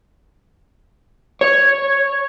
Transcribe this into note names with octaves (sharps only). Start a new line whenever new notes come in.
C#5